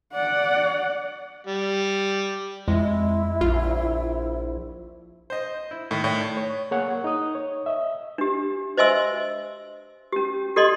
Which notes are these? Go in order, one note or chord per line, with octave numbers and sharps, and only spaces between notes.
D5 F#5
G3
F2 G#3 E4
A#1 F4
C5 D#5
E4
A2 D#3
A2 C#5 D5 G5
C#5
A#3 G#4 C#5 F#5 F#6
D#4 D#6
C#5
D#5 E5
D4 G4
C5 D#5 E5 G#5 C6 E6
C#4 G4
G4 A4 D5 D#5 C6